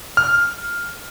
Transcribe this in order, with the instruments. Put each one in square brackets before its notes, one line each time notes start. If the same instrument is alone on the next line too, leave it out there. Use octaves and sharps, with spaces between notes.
[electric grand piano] F6